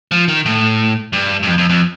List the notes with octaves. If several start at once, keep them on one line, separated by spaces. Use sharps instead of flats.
F3
D#3
A2
G2
G2
F2
F2
F2